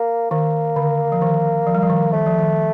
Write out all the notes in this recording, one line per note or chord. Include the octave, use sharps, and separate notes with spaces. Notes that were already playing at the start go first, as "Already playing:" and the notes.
Already playing: A#3
D#3 A#3
D3
F3
D#3
F3
G3
F3
D#3
D#3 A3
F3
D#3